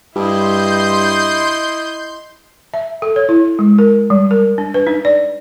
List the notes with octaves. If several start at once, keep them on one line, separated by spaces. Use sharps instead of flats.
G2 E4 D#5 C6 G6
E5
A4
C#5
E4
G#3
A#4
G3
A#4
D4
B4
D#4
D5